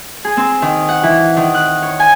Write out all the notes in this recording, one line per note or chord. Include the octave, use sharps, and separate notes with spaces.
G#4
C4
D#3
F#5
E3
D#3
F#6
C#5
G#5